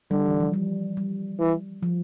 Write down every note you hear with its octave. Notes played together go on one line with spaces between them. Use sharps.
D3 G3
E3
F3
G3
G3
E3
F3